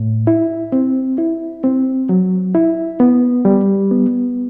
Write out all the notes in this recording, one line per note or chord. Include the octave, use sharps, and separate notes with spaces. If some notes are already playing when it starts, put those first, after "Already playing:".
Already playing: A2
E4
C4
E4
C4
F#3
E4
B3
G3
B3